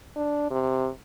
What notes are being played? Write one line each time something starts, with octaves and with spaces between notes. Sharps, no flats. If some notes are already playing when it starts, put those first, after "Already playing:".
D4
C3